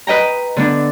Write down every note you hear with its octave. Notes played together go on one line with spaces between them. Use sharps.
B4 D#5 G5 A#5
D3 B3 D4